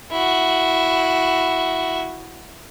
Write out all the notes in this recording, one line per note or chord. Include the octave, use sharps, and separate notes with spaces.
E4 F#4